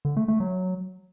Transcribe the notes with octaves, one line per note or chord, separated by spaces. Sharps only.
D3
A3
A3
F#3